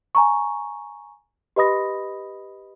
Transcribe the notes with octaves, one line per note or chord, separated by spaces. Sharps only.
G#5 A#5 C#6
G4 B4 D#5 B5 D#6 A#6